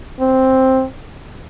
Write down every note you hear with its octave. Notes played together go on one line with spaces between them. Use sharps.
C4